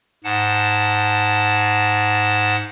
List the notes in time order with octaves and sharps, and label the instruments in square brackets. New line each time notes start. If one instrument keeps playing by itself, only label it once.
[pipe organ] G#2 F#5 A5